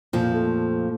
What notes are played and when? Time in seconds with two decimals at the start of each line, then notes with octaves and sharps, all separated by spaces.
0.13 F2 A#2 F3
0.32 A3